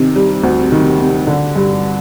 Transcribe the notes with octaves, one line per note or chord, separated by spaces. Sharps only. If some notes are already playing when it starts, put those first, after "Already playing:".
Already playing: C3 D#3
G3
D2
D#3
C3
D3
G2